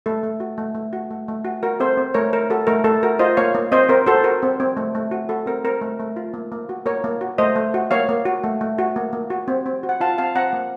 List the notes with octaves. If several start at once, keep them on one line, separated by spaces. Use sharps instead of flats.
A3 A4
A3
F#4
A3
A3
F#4
A3
A3
F#4
F#4 A#4
C4 A4 C5
C4
A3 A#4 C#5
A3 A#4
F#4 A4
A3 A#4
A3 A4
F#4 A#4
F4 C5 D#5
A#3 C#5 F5
A#3
C4 C5 D#5
C4 A#4
F#4 A4 C5
F#4 A#4
C4
C4
A3
A3
F#4
F#4 A4
C4 A#4
C4 A#4
A3
A3
F4
A#3
A#3
F#4
A#3 A#4 C#5
A#3
F#4
A3 C5 D#5
A3
F#4
A#3 C#5 F5
A#3
F#4
A3
A3
F#4
A#3
A#3
F#4
C4
C4
F#4
F#5
F4 F5 A5
C4 F5 A5
C4 F#5 A#5
A#3